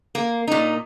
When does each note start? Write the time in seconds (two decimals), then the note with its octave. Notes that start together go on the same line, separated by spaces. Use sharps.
0.15 A#3
0.47 A#2 D#4